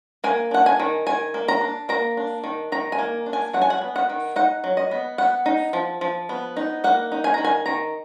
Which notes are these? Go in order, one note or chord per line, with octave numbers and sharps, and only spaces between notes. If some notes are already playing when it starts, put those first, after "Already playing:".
A#3 G#5
D4 F#5
G#5
D#3
D#3 G#5
A#3
A#5
D4
A#3 A#5
D4
D#3
D#3 A#5
G#5
A#3
D4
G#5
F#3 F#5
G#5
F#5
B3
F#5
D#3
D#4 F#5
F#3
D#5
B3
B3 F#5
D#4
F3
F3
B3
D#4
A#3 F#5
D#4
G#5
D#3 A#5
G#5
D#3 A#5